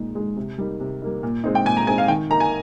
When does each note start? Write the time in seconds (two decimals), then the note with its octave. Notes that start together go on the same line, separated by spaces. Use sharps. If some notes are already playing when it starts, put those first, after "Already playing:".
Already playing: A#2 G#3 D#4
0.15 G#3 D#4
0.36 C3
0.58 G3 A#3 D#4
0.80 C3
1.02 G3 A#3 D#4
1.23 A#2
1.44 G#3 C4 D#4
1.55 G5
1.65 A#2 G#5
1.77 A#5
1.87 G#3 C4 D#4 G#5
1.98 F5
2.08 D#3 G5
2.30 A#3 D#4 A#5
2.40 G#5